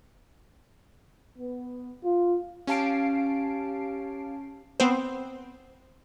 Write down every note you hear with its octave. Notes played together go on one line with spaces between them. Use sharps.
B3
F4
C#4 G4 F5 A5 C7 D7
B3 C4 C5